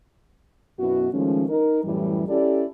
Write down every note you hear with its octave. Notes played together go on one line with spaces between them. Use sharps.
F#2 B2 B3 E4 F#4
D#3 F3 G#3 A3 C#4
D#4 A#4
F#2 A2 E3 G3
C#4 E4 G4 A4 D5